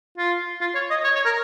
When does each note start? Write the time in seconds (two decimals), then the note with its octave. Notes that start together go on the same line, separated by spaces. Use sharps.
0.18 F4
0.60 F4
0.75 C#5
0.90 D#5
1.04 C#5
1.15 C#5
1.25 A#4